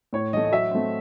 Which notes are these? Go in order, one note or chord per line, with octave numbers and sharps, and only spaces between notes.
A2 C#5
E3 A3 D#5
D#5
F#3 E5
A3 C4